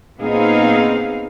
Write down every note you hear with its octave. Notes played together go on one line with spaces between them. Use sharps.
A#2 B3 C4 D#4 G#4 F5